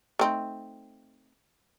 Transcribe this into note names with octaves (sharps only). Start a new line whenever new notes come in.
A3 C4 D#4